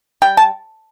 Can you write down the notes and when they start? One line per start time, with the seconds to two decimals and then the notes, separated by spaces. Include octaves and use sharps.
0.22 G3 G5
0.37 A5